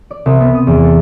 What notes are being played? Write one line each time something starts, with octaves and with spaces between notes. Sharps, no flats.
D5
C2
B3
D#6
E2
A4